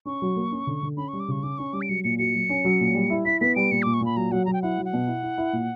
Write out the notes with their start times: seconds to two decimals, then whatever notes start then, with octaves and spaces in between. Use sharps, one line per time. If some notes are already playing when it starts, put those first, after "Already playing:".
0.05 C#4 C#6
0.22 F#3
0.36 A#3
0.51 C#4
0.67 D3
0.83 D3
0.97 C#4 B5
1.08 G3 C#6
1.20 D6
1.28 C#3 C#6
1.43 C#4 D6
1.58 C#4 C#6
1.73 G3 D6
1.82 D7
1.89 F#3 C#7
2.04 A#2 C#7
2.19 F#4 C#7
2.35 F#3
2.49 C#4
2.65 F#3
2.80 A#2
2.95 G3
3.10 E4
3.25 E4 B6
3.41 B3 B6
3.56 G3 D7
3.71 A#2 C#7
3.82 A#2 D6
3.94 C#6
4.01 A#2 B5
4.16 F#3 A#5
4.32 F#3 F#5
4.45 F#3 A#5
4.53 G5
4.62 E4 F#5
4.78 F#3
4.85 F#5
4.93 B2
5.07 E4
5.23 E4
5.38 E4
5.53 A#2